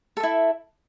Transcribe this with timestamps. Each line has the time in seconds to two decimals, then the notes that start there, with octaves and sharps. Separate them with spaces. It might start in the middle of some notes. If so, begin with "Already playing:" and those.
0.17 A4
0.20 E5
0.23 E4